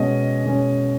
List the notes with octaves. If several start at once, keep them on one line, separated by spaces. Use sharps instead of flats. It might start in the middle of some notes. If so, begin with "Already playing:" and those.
Already playing: B2 G#3 C#4 D#5
B2 G#3 C#4